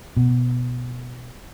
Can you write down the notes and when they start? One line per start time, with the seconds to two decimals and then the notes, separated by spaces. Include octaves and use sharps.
0.17 B2